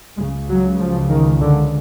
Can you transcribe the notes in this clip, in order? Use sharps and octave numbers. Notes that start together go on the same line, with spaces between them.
C#2 C#3 G#3
F#3
F3
D#3
D3